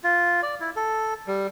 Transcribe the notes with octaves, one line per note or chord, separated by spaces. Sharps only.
F4
D5
E4
A4
G3